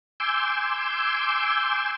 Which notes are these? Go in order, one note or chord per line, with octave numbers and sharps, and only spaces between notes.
G#5 C6 D6 E6 G6